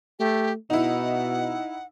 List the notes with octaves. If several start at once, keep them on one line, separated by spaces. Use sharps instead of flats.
A3 G4
B2 D#4 E4 F#5